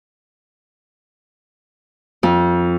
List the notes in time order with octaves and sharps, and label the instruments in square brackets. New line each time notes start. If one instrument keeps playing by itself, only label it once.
[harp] F2